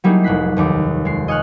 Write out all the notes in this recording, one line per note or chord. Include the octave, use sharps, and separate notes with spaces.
F#3 G3 A#3 D#4 E4 G#4
F1 C2 F#6 B6 C7
F1 D#2 D6
G#3 C7
D#5 G#5 C#6 F6 F#6